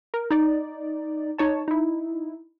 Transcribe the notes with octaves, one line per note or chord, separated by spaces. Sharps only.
A#4
D#4 D5
D#4 C#5 A5
D#4 E4